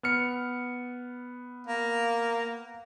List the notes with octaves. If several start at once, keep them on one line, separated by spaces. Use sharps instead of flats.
B3 F6 C#7
A#3